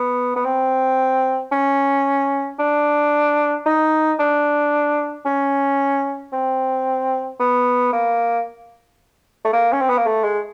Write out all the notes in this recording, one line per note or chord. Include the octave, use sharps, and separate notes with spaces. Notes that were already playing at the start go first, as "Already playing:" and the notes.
Already playing: B3
B3
C4
C#4
D4
D#4
D4
C#4
C4
B3
A#3
A3
A#3
C#4
C4
B3
A#3
A3
G#3